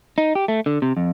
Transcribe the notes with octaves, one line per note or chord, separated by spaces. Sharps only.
D#4
G4
A3
D3
C3
F2